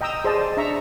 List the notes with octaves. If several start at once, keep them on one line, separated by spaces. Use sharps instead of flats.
D#5 G5 A#5 D#6 E6
G#4 C5 D5 D#5 A5
D4 E5 A#5 C#6